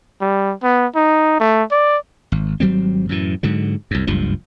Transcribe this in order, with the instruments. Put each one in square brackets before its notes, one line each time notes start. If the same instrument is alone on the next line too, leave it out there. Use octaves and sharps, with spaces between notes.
[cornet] G3
B3
D#4
A3
D5
[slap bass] G#1
G#1 F#3 G3 C4
F#2 A2 E3
G#2 D3 F#3
C2 F#2
F#1 C#2 G2 F3